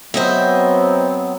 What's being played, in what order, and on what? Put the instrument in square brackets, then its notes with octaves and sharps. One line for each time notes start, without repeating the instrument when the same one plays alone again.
[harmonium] F#3 B3 C4 [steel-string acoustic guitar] C5 D#5 E5